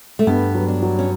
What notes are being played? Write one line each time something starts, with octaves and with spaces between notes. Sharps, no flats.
A3
G2 B3
F#3
D4
F#3
C#4